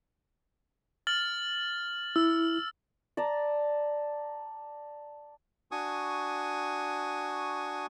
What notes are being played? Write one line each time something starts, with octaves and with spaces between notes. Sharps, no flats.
F6 A6 F#7
E4 E6
D5 A5 A#5
D4 F#4 G#5 C#6 D#6